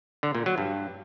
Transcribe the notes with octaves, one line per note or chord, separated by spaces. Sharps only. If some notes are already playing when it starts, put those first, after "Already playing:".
D3
A#2
F#3
G2